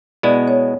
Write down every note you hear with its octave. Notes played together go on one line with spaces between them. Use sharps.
B2 G#3 B3 E4 D5
C#5